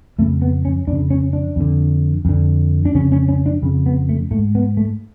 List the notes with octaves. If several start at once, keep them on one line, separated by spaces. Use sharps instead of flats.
F2 C#3 A3
B3
C#4
F2 D4
C#3
C#4
D4
F2 D3
F2 D3
D4
F2 C#3 C#4
C#4
C#4
D4
F2 C#3
B3
A3
G#2 A3
B3
A3